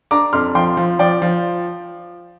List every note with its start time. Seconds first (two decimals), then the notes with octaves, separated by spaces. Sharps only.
0.11 D4 A#5 D6
0.33 F2 C6 F6
0.55 F3 G5 C6
0.77 F3
0.99 F3 D5 G5
1.22 F3